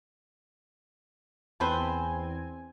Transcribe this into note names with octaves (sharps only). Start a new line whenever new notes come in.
E2 C4 A4 B4 C5 G#5